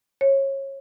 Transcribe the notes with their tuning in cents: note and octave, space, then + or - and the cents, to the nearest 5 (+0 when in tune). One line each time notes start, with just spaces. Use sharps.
C#5 -25